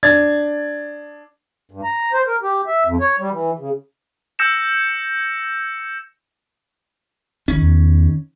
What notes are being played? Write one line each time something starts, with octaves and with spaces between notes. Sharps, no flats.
D4 G#6 A6
G2
A#5
C5
A#4
G4
E5
F2
C#5
G3
E3
C#3
E6 G6 A#6 C#7 E7
A1 D#3 C#4
E2